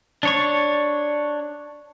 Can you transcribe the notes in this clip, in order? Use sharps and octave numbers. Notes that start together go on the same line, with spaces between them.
D4 C#5 C#6